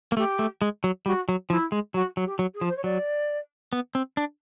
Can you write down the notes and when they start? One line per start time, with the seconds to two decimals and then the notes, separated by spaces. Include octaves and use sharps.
0.12 A#3
0.17 A3 G4
0.39 A3
0.62 G#3
0.84 F#3
1.06 G3 F#4
1.29 F#3
1.50 F3 E4
1.72 G#3
1.94 F#3 F#4
2.17 F#3
2.25 G4
2.39 F#3
2.54 G#4
2.61 F3
2.68 C5
2.76 C#5
2.84 F#3 D5
3.73 B3
3.95 C4
4.17 D4